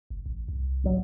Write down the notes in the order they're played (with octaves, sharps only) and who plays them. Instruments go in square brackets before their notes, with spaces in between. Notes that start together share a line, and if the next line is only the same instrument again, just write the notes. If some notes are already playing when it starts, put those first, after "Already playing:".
[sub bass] F#1
A1
C2
[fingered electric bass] G#1 F#3